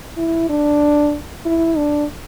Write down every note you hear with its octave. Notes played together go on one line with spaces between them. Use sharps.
E4
D4
E4
D4